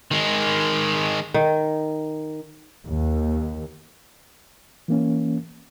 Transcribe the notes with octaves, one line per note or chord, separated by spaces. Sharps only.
D#3 G#3
D#3
D#2
E3 A#3 C#4